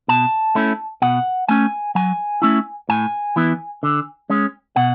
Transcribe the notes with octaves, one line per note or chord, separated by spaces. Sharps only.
B2 A5
A3 C#4 E4
B2 F#5
A3 C#4 G#5
F#3 G#5
A3 C#4 E4
A2 G#5
E3 B3 E4
D3
G#3 C#4
B2 F#5